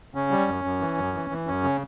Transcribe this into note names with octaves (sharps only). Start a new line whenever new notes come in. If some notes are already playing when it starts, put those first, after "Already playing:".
C#3 C#4
G3
F#2
F#2
E3
F#2
E3
E3
F#2 C#4
C#3